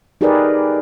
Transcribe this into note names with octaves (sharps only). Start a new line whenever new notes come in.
D#4 G4 G#4 A#4 B4 D5